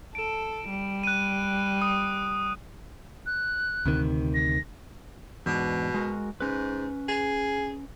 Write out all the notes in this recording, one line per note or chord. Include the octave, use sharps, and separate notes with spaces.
A4 D7 E7
G3
F#6 D#7
D#6
F#6
D2 C3 D#3
A#6
E2 G#2 B2 D4
G#3 F#4 A#4
G#2 C#4 B4
G#4